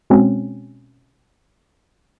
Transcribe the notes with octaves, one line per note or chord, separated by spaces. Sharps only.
B2 G#3 C4 C#4